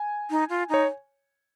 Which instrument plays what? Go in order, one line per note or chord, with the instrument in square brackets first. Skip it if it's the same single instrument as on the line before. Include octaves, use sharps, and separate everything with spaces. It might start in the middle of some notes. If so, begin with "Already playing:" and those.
Already playing: [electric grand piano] G#5
[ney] D#4
F4
[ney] D#4 [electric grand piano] C#5